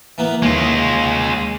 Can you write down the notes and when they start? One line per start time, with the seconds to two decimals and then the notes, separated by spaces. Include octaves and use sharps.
0.18 E3 A#3 B3
0.42 D#2 G#3 F4